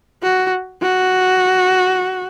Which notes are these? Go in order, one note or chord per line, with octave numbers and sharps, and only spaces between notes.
F#4
F#4